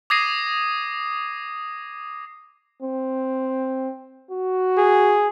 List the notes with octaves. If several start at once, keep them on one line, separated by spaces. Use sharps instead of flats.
D6 D#6 G#6 A#6 C7 D#7
C4
F#4
G#4